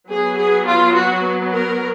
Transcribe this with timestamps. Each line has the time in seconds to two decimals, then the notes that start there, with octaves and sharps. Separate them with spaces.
0.10 F#3 B3 G#4
0.39 G#4
0.68 F4
0.97 F#4
1.54 A#4